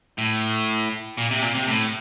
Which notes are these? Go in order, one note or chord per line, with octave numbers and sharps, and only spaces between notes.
A2
A#2
C3
A#2
C3
A2